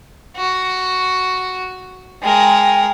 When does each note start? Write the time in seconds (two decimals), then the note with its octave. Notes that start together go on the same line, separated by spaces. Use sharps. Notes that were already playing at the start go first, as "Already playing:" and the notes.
0.37 F#4
2.23 G#3 A#4 G5